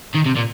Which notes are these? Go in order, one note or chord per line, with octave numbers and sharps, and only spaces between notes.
D#3
C3
A#2